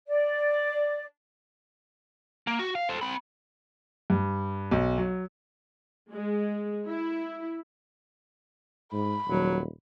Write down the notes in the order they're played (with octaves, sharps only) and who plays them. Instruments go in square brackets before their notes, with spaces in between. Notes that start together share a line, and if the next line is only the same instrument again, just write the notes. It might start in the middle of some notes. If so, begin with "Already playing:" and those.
[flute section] D5
[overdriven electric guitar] A#3
F#4
F5
A4 C5
C4 B5
[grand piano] G2
B1
F#3
[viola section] G#3
E4
[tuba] G#2 [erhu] B5
[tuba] D#1 [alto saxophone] F#3